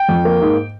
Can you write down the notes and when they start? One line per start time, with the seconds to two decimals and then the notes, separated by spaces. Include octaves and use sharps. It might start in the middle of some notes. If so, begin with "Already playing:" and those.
Already playing: G5
0.09 F2
0.25 A#3
0.41 G#2